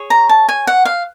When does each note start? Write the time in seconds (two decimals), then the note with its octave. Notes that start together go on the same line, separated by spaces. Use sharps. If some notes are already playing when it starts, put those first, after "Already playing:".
Already playing: G#4 C#5
0.10 A#5
0.29 A5
0.49 G#5
0.67 F#5
0.85 F5